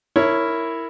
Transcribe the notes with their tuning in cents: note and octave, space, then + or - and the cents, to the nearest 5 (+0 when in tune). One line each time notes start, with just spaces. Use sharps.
E4 +0 A#4 -15 C#5 +0